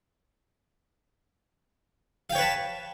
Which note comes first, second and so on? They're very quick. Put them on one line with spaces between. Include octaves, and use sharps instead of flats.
F5 G5 C#5 B4 A5